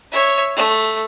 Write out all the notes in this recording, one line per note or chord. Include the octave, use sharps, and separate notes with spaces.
C#5 E5
A3